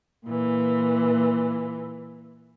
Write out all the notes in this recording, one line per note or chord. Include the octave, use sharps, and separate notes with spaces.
A#2 E3